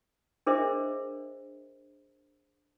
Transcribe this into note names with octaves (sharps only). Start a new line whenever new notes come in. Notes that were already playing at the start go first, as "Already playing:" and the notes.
D4 G#4 A#4 C5 D#5 E5